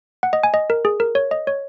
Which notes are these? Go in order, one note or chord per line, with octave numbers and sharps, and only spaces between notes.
F#5
D#5
G#5
D#5
A#4
G#4
A#4
C#5
D#5
C#5